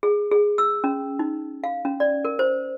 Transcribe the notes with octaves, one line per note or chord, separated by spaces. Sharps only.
G#4
G#4
E6
C#4
D#4
F5
C#4
D5
A#4
C5